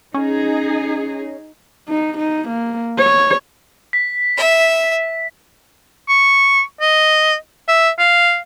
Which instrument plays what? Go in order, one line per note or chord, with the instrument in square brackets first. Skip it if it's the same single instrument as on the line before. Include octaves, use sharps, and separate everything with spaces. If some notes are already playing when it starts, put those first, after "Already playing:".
[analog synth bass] C#4 [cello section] D#4 G#4
[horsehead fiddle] D#4
D#4
A#3
C#5
[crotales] B6
[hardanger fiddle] E5
[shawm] C#6
D#5
E5
F5